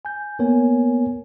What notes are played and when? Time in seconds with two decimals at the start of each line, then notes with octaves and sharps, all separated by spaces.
0.05 G#5 G6
0.39 A#3 B3 A#4 C#5 G#5